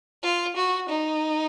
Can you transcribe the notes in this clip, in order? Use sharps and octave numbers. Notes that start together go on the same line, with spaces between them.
F4
F#4
D#4